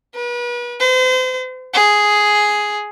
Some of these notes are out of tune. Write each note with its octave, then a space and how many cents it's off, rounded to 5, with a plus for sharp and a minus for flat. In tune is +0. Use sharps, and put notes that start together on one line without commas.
B4 -35
C5 -35
G#4 +5